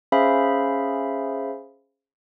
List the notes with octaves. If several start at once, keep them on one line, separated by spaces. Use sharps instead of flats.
C#4 G#4 C5 E5 F5 B5